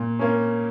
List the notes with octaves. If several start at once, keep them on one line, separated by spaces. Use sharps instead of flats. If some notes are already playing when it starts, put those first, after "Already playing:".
Already playing: A#2
A#3 C#4